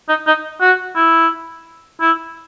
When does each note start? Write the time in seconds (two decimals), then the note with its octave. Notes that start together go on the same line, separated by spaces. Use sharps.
0.09 D#4
0.27 D#4
0.61 F#4
0.96 E4
2.01 E4